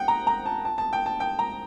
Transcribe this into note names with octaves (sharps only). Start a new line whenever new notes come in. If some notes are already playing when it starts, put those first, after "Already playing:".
Already playing: F#5 G5
A#5
A#5
A5
A5
A5
G5
A5
G5
A#5